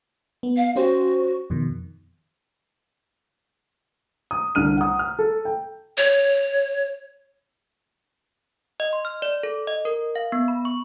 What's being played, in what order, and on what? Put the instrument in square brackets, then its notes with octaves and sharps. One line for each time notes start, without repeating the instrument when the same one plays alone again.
[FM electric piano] B3
[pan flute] F5
[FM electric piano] C#4 G4 C5 [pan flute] F#4
[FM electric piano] F2 B2 D#3
[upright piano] D#6
C2 D3 F6 D#7
F#5 D#6
F6
A4
G5
[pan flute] C#5
[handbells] D#5
C6
F6
D5
A4
D#5
A#4
F5
B3
B5
C#6